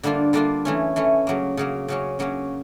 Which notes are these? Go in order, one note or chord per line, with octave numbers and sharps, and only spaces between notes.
D3 G3 A#3 D4 F4
D3 G3 A#3 D4 F4
E3 A3 C#4
E3 A3 C#4
C#3 F#3 A#3
C#3 F#3 A#3
C#3 F#3 A#3 C#4
C#3 F#3 A#3 C#4